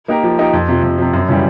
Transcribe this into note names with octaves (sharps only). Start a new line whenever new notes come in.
A#3 D#4 G4 A#4
F3
A#3 D#4 G4 A#4
F2
C3 F3
F2
C3 F3
F#2
C#3 E3 G3